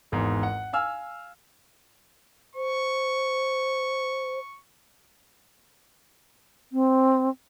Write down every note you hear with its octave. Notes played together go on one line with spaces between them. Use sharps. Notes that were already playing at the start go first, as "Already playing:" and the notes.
G#1 E2 G#2
F#5
F5 G#5 E6 F6
C5 C#6
C4